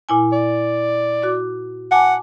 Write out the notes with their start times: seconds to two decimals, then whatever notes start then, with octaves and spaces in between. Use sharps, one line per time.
0.09 A#2 E4 G#5
0.32 D5
1.22 F#4 D6
1.91 F#5 G#5 A5 D6